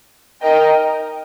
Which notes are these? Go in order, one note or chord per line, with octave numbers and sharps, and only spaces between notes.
D#4 A#4 D#5 G5